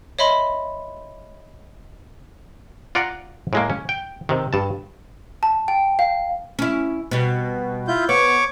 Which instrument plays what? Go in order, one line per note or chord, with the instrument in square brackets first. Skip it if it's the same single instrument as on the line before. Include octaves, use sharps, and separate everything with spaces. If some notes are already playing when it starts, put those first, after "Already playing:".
[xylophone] C#5 D#5 E5 B5 C6
[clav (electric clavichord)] F4 D5 F#5 A#5
A2 G#3 A#3
C#4
G5
C3 D#3
G2 A5
[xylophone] A5
G5
F5
[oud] C#4 E4
B2 G3
[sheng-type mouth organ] E4 F4 G6
[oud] B3 [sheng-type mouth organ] C#5 C#6 D6